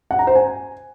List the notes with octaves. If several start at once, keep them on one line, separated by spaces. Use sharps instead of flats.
F#5
A#5
C5
G#5